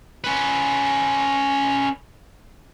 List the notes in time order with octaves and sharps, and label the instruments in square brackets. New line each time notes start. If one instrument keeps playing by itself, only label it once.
[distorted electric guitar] C#4 B4